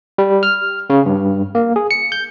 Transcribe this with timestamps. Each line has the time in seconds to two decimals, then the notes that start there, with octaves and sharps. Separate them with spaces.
0.18 G3
0.43 F6
0.90 C#3
1.06 G2
1.55 A#3
1.76 G#4
1.91 C#7
2.12 G6